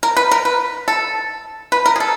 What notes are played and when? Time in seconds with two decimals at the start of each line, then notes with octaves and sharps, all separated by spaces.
0.03 A#4
0.17 B4
0.31 A#4
0.45 B4
0.88 A4
1.72 B4
1.86 A#4
1.96 G#4
2.00 A4